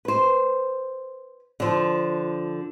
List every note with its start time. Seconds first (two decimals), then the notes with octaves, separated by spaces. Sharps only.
0.05 B4 C5
1.60 D3 F3